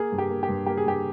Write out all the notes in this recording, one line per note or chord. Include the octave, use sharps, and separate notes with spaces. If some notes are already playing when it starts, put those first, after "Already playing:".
Already playing: A#3 G#4
G2
G4
A#3
G4
G2
A#3 G4
G#4
G2 G4